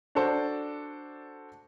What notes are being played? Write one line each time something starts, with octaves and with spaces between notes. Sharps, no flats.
D4 F#4 A4 C5 D5